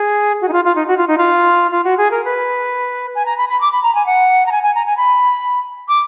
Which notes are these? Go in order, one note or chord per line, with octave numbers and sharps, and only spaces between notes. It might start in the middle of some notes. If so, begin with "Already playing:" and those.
Already playing: G#4
F#4
D#4
F4
F4
D#4
F#4
F4
D#4
F4
F4
F#4
G#4
A#4
B4
G#5
A#5
B5
B5
D6
B5
A#5
G#5
F#5
A#5
G#5
G#5
A#5
G#5
B5
D6